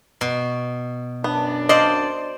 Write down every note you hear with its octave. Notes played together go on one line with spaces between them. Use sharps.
B2
F#2 B3 D4
C5 D5 D#5 F5